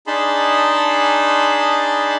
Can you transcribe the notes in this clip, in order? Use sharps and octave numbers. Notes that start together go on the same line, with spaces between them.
D4 D#4 G#4 A5 B5 C6